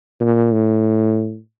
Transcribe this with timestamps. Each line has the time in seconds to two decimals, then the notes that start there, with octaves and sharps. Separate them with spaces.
0.20 A#2
0.52 A2